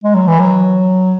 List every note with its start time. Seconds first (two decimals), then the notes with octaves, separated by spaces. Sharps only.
0.04 G#3
0.15 F#3
0.28 E3
0.40 F#3